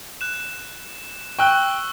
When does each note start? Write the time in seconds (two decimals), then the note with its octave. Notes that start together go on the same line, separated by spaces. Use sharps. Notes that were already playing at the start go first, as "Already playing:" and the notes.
0.21 F#6 E7
1.39 G5 C#6 E6 F#6 G7